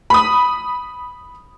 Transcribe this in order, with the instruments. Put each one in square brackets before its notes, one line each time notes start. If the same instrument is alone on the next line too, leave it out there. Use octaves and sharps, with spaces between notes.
[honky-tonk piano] B5 D#6